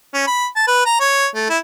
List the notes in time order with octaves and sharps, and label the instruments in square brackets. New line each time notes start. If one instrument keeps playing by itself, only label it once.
[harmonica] C#4
B5
A5
B4
A#5
C#5
A3
E4